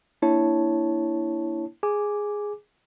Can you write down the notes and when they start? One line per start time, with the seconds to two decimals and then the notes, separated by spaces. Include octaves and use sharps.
0.22 A#3 D4 E4 C#5 A5
1.83 G#4 G#5 D6